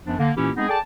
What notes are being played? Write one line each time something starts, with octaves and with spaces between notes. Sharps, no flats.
F#2 F3 B3 D4
D3 A#3
A#2 E3 A#3 C#4 E4 G4
G#3 B3 C4 D#4 G#4
G#4 A4 D5 G5 A5